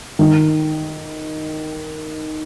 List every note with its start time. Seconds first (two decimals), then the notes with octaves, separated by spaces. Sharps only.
0.19 D#3